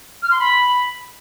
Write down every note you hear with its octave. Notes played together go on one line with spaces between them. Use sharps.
F6
C6
B5